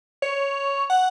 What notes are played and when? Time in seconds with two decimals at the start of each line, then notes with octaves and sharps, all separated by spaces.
0.22 C#5
0.90 F#5